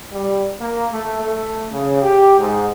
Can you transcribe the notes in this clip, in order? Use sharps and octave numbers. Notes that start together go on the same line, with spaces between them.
G3
A#3
A3
A3
C#3
G4
G#2